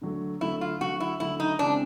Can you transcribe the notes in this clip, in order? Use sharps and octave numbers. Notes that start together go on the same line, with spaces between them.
D3 F#3 A3
D3 F#3 A3 E4
F4
D3 F#3 A3 F#4
E4
D3 F#3 A3 E4
D#4
C#3 E3 G#3 C4 D4